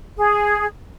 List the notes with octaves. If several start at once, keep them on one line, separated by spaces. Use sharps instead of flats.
G#4